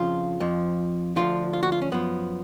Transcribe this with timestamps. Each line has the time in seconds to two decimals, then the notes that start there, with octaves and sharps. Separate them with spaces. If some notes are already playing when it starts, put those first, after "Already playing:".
Already playing: F2 C#3 F3 F4
0.40 F2 F3
1.16 D2 D3 F3 F4
1.53 F4
1.63 F#4
1.72 F4
1.81 C#4
1.92 F#2 F3 B3